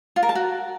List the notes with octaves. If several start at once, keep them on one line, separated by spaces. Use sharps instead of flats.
F4
A#4
A5
F#4